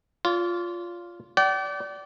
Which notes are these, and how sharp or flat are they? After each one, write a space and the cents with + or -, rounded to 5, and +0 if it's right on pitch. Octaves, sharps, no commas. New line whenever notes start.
F4 +0 D5 -45
D5 -20 G5 -45